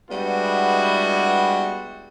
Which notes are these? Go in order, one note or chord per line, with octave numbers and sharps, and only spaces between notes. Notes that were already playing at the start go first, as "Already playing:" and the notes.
G3 G#3 B3 D4 E4 F#4